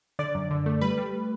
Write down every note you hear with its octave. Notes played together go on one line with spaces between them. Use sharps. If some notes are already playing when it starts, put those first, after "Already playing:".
D3 D5
F#2
D3
A3
G3 B4
G3